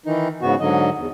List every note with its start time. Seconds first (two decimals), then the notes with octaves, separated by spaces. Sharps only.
0.06 D#3 E3 D#4
0.42 G#2 C#3 B3 F#4
0.60 G#2 D3 F#3 D#5
0.97 E2